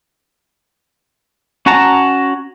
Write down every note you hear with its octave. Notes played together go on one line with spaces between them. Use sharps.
C#4 F#4 F#5 A5 A#5